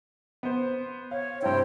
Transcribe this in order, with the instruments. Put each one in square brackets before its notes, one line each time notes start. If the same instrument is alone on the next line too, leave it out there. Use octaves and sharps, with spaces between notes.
[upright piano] B3 C5
[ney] C#5 [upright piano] F5
[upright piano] G2 C3 E4 [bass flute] C5 [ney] G5